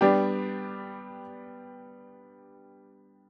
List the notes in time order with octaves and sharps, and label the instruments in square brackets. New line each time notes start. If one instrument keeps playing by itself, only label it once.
[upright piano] G3 B3 D4 G4